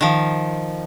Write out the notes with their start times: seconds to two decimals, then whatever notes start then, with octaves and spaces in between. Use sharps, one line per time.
0.01 D#3 F3